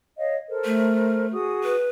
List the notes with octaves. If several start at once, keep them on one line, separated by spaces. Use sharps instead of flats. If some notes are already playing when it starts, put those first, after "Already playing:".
C#5 D#5 F5
A4 A#4 C5
A3
F#4 G#4 D#6
B4